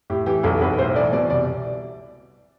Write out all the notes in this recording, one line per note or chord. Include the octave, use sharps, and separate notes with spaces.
A2 G4
E3 G4
B1 A4
B1 B4
A2 C5
E3 D5
B2 D5
C2 D5